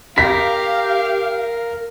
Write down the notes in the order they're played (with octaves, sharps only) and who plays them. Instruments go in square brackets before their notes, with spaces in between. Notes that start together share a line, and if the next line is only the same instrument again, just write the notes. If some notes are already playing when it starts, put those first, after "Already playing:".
[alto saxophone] G4 [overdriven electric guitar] A#4 [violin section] F5 [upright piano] B6